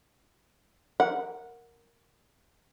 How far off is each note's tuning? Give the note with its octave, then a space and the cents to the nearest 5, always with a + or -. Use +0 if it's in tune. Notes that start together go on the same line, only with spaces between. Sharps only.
A#4 +0 F#5 -15